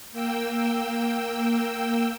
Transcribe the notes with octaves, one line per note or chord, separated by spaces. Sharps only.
A#3 G5 E6